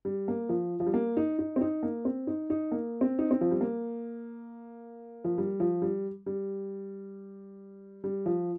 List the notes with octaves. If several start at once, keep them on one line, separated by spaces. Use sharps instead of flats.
G3
A#3
F3
F3
G3
A#3
D#4
D#4
C4
D#4
A#3
C4
D#4
D#4
A#3
C4
D#4
C4
F3
G3
A#3
F3
G3
F3
G3
G3
G3
F3